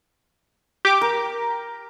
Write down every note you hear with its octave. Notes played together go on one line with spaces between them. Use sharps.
G4 D6
A#4